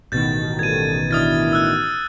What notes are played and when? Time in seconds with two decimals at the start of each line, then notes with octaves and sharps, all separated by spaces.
0.12 A1 B2 D#3 G6 A6
0.59 C#3 G3 A4 G#6 D#7
1.11 D4 E4 D#6 F6 A6
1.53 E6 F#6